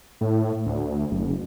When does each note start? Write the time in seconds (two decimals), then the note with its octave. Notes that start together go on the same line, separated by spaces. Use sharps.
0.21 A2
0.66 D2
1.11 F#1